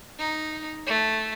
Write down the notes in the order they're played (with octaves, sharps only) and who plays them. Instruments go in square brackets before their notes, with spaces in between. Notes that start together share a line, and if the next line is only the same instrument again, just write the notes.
[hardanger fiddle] D#4
A3